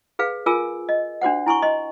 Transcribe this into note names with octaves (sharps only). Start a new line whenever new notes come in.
G#4 B4 F5
F4 G#4 A#4 G#5 E6
D#5
D4 F#4 C5 F#5
E4 G#5 C6 C#6
D#5 C6